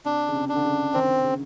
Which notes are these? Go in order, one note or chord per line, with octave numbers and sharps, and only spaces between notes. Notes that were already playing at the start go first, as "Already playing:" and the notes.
C3 D4
C#3
C3
D4
D3
C#3
D#3 C4
C#3